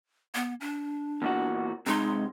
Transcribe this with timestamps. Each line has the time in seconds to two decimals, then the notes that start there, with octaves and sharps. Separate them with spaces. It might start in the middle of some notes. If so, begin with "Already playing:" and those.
0.35 B3
0.61 D4
1.22 E2 A#2 F#4
1.86 C3 G#3 D#4 C6